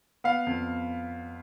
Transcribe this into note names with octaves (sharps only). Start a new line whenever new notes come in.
B3 F5
F2